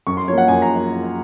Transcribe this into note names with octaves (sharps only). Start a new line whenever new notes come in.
F#2 C#6
C6
F3 A#3 C#5
F#5
F#2 G#5
A#5